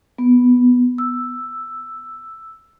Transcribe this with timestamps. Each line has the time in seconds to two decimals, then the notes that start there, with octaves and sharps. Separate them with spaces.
0.18 B3
0.98 E6